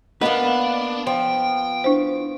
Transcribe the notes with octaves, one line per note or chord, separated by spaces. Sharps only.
A#3 B3 D4 B4 D#5 F#5
F3 G5
D4 E4 C5